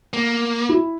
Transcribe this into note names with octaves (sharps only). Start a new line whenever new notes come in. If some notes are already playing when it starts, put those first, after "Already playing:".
A#3
E4